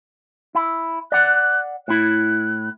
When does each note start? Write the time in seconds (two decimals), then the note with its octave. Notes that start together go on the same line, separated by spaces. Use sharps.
0.55 E4
1.12 D5 F#5 F#6
1.88 A2 E4 F#6